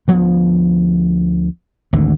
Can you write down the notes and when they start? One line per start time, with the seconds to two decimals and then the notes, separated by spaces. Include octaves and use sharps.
0.08 D2 F3 B3
1.93 G#1 D2 D3